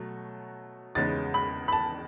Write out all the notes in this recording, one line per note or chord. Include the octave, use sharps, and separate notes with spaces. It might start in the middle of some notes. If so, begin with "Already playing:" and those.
Already playing: B2 F#3 A3
E2 C#3 G#3 B3 D#4 A6
B5
B5
A5